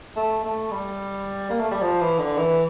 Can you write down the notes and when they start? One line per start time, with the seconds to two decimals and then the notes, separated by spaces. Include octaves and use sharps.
0.16 A3
0.44 A3
0.71 G3
1.50 A#3
1.60 A3
1.71 G3
1.82 F3
2.01 E3
2.19 D3
2.38 E3